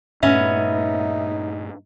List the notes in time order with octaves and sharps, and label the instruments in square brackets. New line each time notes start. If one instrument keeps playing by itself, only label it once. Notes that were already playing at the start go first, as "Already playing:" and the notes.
[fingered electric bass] G2 A#2 A3 [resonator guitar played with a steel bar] B3 C#4 [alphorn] D#4 [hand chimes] E5